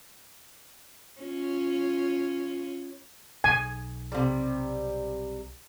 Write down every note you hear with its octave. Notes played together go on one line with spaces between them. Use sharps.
C#4 F4
B1 G#5
C3 G3